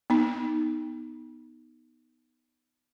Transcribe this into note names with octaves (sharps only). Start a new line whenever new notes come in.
B3 D#4